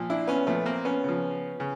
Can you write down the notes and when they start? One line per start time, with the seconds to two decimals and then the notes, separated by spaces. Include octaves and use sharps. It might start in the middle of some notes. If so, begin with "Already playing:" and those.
Already playing: A#2 F3
0.10 D4 E4
0.28 B3 C#4
0.47 A#2 F3 A3 B3
0.66 A#3 C4
0.85 B3 C#4
1.04 C#3 F3
1.60 C#3